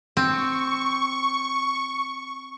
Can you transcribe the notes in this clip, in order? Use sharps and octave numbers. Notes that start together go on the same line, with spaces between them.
C4 C#6